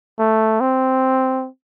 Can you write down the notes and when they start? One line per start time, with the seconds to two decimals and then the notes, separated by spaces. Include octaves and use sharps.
0.19 A3
0.61 C4